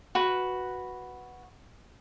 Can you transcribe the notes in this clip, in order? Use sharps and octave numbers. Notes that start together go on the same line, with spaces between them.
F#4 B4